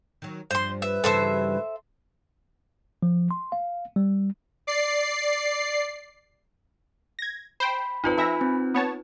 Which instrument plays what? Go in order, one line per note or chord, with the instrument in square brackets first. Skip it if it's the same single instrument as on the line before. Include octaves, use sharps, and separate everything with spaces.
[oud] D#3 F#3
[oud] G2 F3 [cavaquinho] C5 C6
[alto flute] B4 [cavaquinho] E5
[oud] G2 C#3 E3 [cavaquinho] A4 C5 E5
[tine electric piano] F3
C6
F5
G3
[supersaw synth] D5 C7
[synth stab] G#6 A#6
[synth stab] C5 G5 [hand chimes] B5
[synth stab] G#1 F2 [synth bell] D#4 F4 B4
[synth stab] F2 E5 A#6 [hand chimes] G#5 B5
[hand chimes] C4
[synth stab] B3 C#5 A5